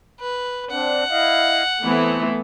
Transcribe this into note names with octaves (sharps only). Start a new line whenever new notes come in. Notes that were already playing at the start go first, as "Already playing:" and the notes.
B4
C4 D4 F#5
E4 D#5 F5
E3 A3 B3 C4